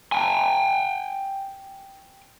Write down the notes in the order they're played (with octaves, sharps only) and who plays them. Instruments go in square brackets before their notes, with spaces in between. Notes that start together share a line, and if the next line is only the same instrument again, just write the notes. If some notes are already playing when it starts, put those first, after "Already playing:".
[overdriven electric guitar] G5 G#5